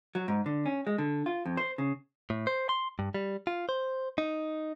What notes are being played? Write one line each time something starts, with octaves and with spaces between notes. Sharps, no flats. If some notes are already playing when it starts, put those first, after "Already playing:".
F#3
G#2
D3
C#4
G#3
D3
F4
F2
C5
C#3
A2
C5
C6
G2
G3
F4
C5
D#4